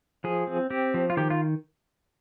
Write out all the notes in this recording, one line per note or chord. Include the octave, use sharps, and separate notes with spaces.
F3 G#4
C4
C4 G4
F3
F4
D#3 G4
F4